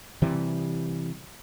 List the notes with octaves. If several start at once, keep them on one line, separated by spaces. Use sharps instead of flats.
C3 E3 G3